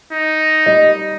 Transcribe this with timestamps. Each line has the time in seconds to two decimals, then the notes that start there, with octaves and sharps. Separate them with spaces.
0.11 D#4
0.66 G3 D#5